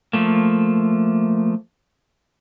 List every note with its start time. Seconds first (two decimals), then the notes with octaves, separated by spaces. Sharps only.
0.13 F3 A3 A#3